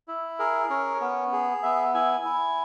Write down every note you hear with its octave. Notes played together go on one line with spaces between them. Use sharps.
E4
G#4 A#4
C#4 A#4
B3
G#4
B3 E5
E4 G#5
E4